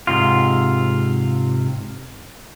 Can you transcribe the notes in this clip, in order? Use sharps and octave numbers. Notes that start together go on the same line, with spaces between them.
G#2 C3 F4